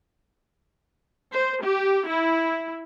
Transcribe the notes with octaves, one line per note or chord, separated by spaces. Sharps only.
C5
G4
E4